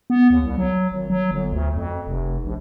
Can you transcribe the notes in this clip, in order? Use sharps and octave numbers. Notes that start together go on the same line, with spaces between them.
B3
D#2
C2
F#3
G#1
F#3
G1
D2
F2
F1
A#1